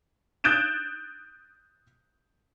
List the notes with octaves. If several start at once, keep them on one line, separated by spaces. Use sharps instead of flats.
D#6 F#6 G6 A6 D7 E7